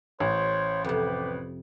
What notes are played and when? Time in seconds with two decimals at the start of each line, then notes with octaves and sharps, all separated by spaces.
0.20 A1 C5 C#5
0.84 F2 C3 G4 B4